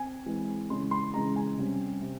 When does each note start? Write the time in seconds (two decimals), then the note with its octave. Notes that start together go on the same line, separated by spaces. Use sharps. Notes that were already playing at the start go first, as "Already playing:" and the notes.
Already playing: C4 G#5
0.26 E3 G#3 C4
0.70 C#3 E3 G#3 C#4 C6
0.91 C6
1.14 C#3 E3 G#3 C#4 A#5
1.36 G#5
1.58 C3 G3 C#4
2.01 C3